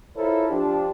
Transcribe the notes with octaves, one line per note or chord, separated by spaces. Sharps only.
E4 F4 A4 A#4 C5 C#5
F3 D4 G4